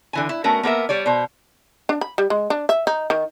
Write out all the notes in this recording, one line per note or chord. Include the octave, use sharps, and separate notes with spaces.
D3 E3 G#5
E4
A3 B3 C#4 F#4 A#4
A#3 B3 A#4 E5
G3 C#5 D5
B2 C5
D4
B5
G3
G#3
D4
E5
D#4
D#3